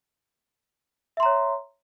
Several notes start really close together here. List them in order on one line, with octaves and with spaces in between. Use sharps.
E5 C6 A#5 C#5